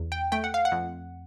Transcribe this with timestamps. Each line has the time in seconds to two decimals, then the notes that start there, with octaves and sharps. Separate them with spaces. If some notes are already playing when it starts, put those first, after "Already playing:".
Already playing: E2
0.12 G5
0.32 A3 G5
0.44 F#5
0.54 F5
0.65 F#5
0.72 F2